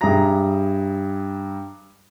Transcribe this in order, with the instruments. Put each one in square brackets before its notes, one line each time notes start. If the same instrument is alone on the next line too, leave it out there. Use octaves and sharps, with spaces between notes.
[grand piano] G2 G4 G#4 E5 A#5 A#6